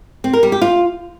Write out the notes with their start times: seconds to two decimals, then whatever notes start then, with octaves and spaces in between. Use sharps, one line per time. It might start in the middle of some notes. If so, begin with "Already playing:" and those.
0.24 C4
0.33 A#4
0.43 G3
0.52 G4
0.62 F4